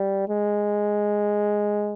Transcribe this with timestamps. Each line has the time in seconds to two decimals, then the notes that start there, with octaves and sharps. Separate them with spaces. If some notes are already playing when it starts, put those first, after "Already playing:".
Already playing: G3
0.28 G#3